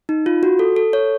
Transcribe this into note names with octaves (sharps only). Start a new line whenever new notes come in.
D#4
F4
F#4
A4
A4
C#5